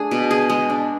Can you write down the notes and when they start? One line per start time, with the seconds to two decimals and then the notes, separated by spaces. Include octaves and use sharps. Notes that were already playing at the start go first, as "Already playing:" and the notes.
Already playing: A3 D4 G#4
0.11 B2
0.31 G#4
0.50 G#3
0.70 D4